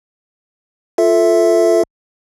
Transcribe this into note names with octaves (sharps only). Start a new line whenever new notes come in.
F4 A4 E5